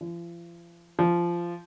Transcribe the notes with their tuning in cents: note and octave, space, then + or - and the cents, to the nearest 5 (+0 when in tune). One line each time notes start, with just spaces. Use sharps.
F3 -40
F3 -15